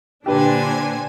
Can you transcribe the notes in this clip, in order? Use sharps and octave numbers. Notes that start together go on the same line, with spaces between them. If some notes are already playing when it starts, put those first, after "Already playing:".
A#2 D3 D4 G4 B4 C5 G#5